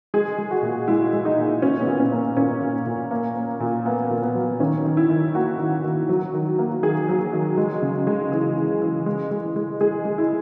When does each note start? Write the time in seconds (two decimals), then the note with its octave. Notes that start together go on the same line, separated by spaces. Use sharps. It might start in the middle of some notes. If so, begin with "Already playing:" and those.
0.14 G#3 G#4
0.38 G#3
0.51 F#4
0.63 A#2
0.88 G#3 E4
1.13 G#3
1.25 D#4
1.38 A#2
1.62 A#2 C#4
1.81 B3
1.87 A#2
2.00 C#4
2.12 A#3
2.37 A#2 C#4
2.62 A#2
2.86 A#2
3.11 A#3
3.36 A#3
3.60 A#2
3.85 A#3 B3
4.10 A#2
4.23 B3
4.35 F#3
4.60 D#3 C#4
4.85 D#3
4.97 E4
5.10 D#3
5.35 A#3 F#4
5.60 D#3
5.84 D#3
6.09 F#3
6.34 D#3
6.58 A#3
6.83 D#3 G#4
7.09 F#3
7.33 D#3
7.57 G#3
7.82 C#3
8.07 G#3
8.32 E3 G#4
8.57 E3
8.81 E3
9.06 G#3
9.31 G#3
9.56 G#3
9.81 G#3 G#4
10.05 G#3
10.18 E4